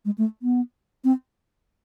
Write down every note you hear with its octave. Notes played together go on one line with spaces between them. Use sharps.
G#3
A3
B3
C4